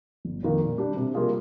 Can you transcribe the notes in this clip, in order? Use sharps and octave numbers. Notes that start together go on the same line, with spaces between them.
G1
F2 D#3 A#3
A#2
G3 D4 G4
C3
G3 A#3 F4 G#4